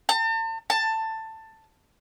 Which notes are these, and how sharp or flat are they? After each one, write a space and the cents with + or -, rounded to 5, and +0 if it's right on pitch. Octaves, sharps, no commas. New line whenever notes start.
A5 +40
A5 +15